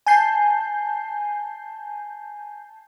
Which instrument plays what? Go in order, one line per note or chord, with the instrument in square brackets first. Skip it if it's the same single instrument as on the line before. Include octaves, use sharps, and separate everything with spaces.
[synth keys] G#5 A5 G6 C7